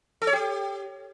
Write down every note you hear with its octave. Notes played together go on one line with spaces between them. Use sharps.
A4
C#5
G4